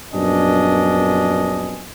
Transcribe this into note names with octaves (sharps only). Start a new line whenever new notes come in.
A#1 F#2 B3 D4 D#5 G#5